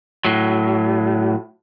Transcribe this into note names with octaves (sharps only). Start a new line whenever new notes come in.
A2 F#3